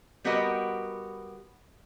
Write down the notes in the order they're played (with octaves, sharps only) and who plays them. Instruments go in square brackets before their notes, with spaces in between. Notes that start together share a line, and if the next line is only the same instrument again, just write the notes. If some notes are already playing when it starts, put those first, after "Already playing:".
[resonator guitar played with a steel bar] G3 B3 F#4 G4 A#4 D#5